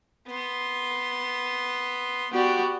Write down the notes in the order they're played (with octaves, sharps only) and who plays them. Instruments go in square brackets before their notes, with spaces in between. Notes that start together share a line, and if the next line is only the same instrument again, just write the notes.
[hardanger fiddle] B3 C6
[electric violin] B3 F#4 [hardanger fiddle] G4 D5